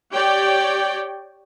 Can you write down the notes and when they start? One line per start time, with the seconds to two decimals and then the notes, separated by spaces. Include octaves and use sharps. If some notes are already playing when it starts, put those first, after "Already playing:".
0.11 G4 C#5 D5 G5